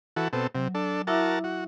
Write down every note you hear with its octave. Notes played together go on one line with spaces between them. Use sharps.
E3 F#4 A4
B2 C4 A4
C3 F#3
D4 A4
E4 F#4 A#4 E5 A5 D6
F#4